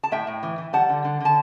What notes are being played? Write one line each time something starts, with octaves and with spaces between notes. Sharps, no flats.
A5
A2 E5 G5
A2
E3
E3
G3 F#5 A5
D3
D3
D3 A5